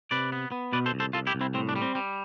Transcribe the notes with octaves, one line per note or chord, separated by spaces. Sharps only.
C3 B4 D5
B3
B3
B2 B4 D5
A4 C5
C2
A4 C5
C2 F4 A4
E4 G4
C2
C4 E4
A2 C4
D4
G3
C4
G3